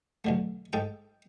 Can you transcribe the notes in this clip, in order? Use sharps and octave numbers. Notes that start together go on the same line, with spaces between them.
B1 D3 A3
G#2 A4 G5